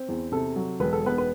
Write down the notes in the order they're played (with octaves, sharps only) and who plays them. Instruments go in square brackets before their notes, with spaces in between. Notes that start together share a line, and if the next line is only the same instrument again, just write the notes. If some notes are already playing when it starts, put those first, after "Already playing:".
Already playing: [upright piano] C4
E2
C3 A4
F#3
E1 B4
A4
E1 B3 B4
B4